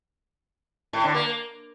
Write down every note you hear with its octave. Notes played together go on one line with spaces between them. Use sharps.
A2
D3
A#3